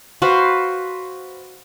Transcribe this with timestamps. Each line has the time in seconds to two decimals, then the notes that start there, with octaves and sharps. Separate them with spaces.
0.22 F#4 B4 C5 F5